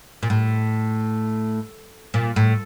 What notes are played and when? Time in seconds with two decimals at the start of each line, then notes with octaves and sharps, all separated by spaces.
0.23 A#2
0.30 A2
2.14 A#2
2.36 A2